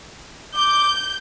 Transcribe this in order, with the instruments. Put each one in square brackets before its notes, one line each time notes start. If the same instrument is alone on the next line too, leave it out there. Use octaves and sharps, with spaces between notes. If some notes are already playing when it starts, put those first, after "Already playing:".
[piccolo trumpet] D6 [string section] G6